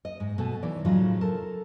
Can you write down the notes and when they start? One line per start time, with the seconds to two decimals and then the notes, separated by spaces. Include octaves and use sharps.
0.05 D#5
0.20 G#2
0.38 B2 A3 A4 G#5
0.63 E3 D#4 C#5 D5
0.85 A2 C#3 F3 F#3 D#4 F4
1.21 A4 A#4 A5